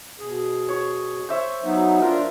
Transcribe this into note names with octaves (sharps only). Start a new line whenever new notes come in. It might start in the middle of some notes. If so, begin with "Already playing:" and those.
B2 G#4
C#5
C5 C#5 E5
F#3 B3 D#4
D4 F4 A#4